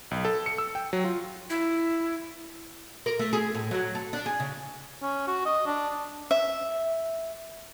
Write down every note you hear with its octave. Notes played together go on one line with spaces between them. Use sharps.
B1
A4
C#7
E6
G5
F#3
F4
E4
A#4
A3
G#4
A2
F#3
A4
D4
G#4
C#3
C#4
F#4
D#5
D4
E5